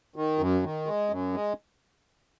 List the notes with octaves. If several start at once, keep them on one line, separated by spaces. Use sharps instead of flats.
D#3
F#2
D#3
G#3
F#2
G#3